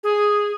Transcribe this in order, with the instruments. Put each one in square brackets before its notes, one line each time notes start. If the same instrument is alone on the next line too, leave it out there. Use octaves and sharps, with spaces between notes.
[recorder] G#4